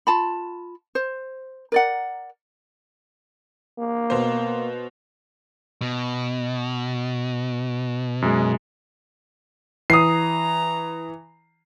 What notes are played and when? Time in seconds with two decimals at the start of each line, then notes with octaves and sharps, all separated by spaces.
0.07 F4 A5 B5
0.95 C5
1.72 A#4 D5 F#5
3.79 A#3
4.10 B2 C5
5.81 B2
8.22 F#2 G#3
9.90 E3 A#5 D#6 C7